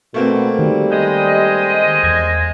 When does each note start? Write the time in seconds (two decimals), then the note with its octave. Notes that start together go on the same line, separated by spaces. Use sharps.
0.14 B2 A3 A#3 C4
0.59 D#3 G3
0.91 G#3 C5 D#5
2.03 E2 G#6 A#6